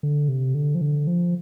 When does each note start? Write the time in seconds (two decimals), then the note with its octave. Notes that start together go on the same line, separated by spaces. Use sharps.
0.03 D3
0.28 C3
0.54 D3
0.75 F3
0.81 D3
1.07 F3